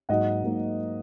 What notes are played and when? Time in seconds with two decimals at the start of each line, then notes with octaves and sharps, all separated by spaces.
0.09 G#2 F#3 A#3 D#5 F#5
0.44 G#2 F#3 A#3